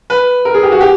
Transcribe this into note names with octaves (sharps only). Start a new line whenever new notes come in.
B4
A#4
G#4
G4
F#4
G4